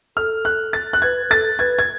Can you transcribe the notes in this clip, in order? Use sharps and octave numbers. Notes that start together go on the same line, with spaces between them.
A4 F6
F#6
A6
F#6
B4 G#6
A4 A6
B4 G#6
G#6